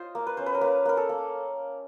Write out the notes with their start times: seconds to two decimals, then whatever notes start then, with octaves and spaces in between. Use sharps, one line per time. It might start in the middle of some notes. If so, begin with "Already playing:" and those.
Already playing: F4 C5 D#5
0.15 A#3
0.27 B4
0.37 C#4 C5
0.46 B4
0.55 A#4
0.61 A#3 B4
0.85 A#3 A#4
0.97 A4
1.09 A#3